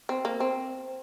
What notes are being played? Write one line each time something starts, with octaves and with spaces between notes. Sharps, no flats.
C4
A#3
C4